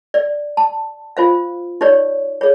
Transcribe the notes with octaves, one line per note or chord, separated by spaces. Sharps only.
D5
A5
F4 C5 F5
D#4 G4 C#5 D5
G#4 C#5